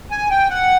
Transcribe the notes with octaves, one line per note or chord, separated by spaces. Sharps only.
G#5
G5
F#5